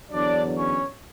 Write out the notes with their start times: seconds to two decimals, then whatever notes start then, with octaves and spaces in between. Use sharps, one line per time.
0.12 E2 D3 F#3 D4 D5
0.55 C#4 C#5